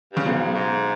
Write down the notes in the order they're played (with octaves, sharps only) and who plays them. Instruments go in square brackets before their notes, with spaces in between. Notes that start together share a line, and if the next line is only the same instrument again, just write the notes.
[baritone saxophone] G2 [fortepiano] C#3
[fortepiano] B1 B2 [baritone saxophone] G#2
[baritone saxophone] G#2